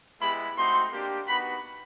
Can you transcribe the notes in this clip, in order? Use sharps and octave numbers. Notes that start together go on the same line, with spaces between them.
G#3 B3 E4 G4 B5
A3 C4 D#4 F#4 C6
A#3 D4 G4
B3 D#4 F#4 B5